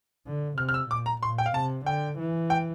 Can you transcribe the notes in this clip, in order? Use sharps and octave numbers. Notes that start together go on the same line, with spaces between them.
D3
C3 F6
F6
E6
A#2 D6
A#5
A#2 C6
G5
F5
C3 A5
D3 G5
E3
G5